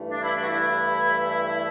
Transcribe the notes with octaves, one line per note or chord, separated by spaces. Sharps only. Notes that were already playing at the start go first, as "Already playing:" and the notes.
Already playing: G2 E3 A3
D4
E4
D4
F#4
E4